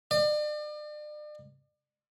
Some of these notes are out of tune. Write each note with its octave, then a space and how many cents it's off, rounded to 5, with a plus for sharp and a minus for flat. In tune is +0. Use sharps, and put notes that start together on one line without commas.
D5 +40